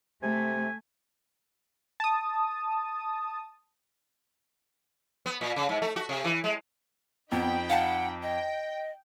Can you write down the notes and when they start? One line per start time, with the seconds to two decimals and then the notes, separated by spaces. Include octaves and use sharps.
0.23 C3 A3 G#5
2.00 A5 D#6
5.26 B3
5.41 A#2
5.56 C#3
5.69 G#2
5.82 A3
5.96 F#4
6.09 C3
6.24 E3
6.44 G#3
7.32 F2 B3 D#4 G5 B5
7.70 F5 F#5 A5
8.23 D#5 G5